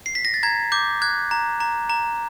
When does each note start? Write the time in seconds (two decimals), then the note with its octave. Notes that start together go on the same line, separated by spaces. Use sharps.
0.06 C7
0.15 B6
0.25 A#6
0.34 A6
0.43 A#5 G#6
0.72 D6 G6
1.02 F#6 G#6
1.31 A#5
1.60 A#5
1.90 A#5